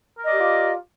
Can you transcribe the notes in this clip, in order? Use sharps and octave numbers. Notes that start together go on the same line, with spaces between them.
F4 G4 A#4 D5 D#5